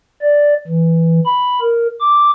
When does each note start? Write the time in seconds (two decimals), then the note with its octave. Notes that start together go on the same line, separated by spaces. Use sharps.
0.21 D5
0.68 E3
1.25 B5
1.61 A#4
2.01 D6